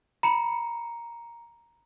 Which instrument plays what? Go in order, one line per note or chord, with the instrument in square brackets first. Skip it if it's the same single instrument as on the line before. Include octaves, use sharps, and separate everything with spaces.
[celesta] A#5 C#7 [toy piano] B5